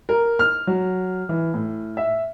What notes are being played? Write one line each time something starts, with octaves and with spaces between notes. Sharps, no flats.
A#4
F6
F#3
E3
A2
E5